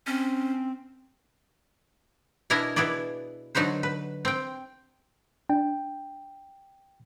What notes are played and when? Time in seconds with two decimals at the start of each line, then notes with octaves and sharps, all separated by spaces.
0.07 C4 C#4
2.50 B2 D4 E4 A#4 D#5 G#5
2.76 B2 B3 E4 G#4 D5
3.55 D3 F#3 D#4 B4 C5
3.83 B4
4.25 C4 G5
5.49 D4 G5